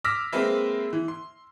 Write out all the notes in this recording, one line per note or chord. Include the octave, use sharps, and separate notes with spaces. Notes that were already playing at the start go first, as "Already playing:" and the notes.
D6 E6 F6 A#6 B6
G#3 A#3 C4 B4 E5
E3
C6